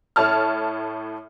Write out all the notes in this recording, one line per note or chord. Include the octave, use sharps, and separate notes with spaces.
A2 C#5 A5 F6